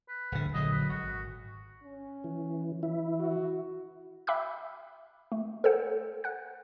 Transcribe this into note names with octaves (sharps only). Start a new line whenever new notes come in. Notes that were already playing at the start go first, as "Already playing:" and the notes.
B4
D1 G1 D3
A#1 D3 F#3 D#5
B4
G#1 F#4
C#4
E3
E3 E4
F#4
E5 G5 B5 D6 E6 F#6
A3
A4 A#4 C5 F#5
F#5 F#6